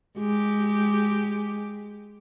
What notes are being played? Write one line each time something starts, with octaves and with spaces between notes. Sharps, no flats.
G#3 G4